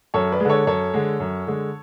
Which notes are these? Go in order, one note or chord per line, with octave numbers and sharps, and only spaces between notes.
F#2 A4 C#5
B4 D5
G#3
D3 A4 C#5
F#2 A4 C#5
D3 G#3
F#2
D3 G#3